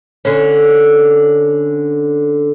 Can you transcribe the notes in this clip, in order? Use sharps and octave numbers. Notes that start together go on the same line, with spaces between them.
D3 C#4